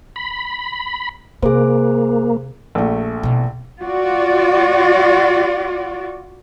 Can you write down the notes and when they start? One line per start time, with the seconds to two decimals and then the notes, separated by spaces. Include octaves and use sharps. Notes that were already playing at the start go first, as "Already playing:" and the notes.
0.16 B5
1.42 C3 A#3 G#4 C5
2.75 A#1 A3
3.23 B2 E3
3.80 F4 F#4 D5